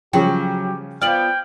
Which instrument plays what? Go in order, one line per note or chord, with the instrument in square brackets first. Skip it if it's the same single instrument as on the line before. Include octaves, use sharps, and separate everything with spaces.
[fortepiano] C#3 F3 [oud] F#3 [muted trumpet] G4 [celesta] G5
[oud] B3 F4 D5 [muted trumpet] G5 [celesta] F6 F#7